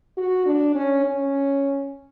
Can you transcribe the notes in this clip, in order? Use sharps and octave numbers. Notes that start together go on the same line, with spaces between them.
F#4
D4
C#4
C#4